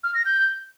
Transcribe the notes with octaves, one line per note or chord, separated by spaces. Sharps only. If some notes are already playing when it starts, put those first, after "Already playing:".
F6
A#6
G6